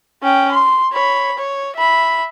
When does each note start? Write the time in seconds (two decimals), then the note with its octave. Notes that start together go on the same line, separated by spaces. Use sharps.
0.23 C#4 G5
0.52 C6
0.92 C#5 B5
1.38 C#5
1.76 E5 B5